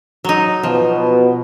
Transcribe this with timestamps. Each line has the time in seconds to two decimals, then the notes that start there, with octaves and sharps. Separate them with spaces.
0.24 F#3 D#4
0.63 B2 F3